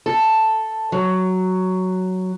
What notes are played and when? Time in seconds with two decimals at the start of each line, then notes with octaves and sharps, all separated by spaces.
0.06 A4
0.92 F#3